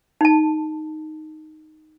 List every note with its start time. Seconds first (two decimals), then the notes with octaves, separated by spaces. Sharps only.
0.21 D#4 A5